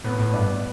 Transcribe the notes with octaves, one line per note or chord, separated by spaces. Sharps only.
A2 B3
A2
G2 D4